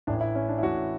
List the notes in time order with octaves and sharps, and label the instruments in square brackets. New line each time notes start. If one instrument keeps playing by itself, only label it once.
[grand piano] A1 A2 E3 D4
E4
C#4
D4
E4
A1 A2 E3 F#4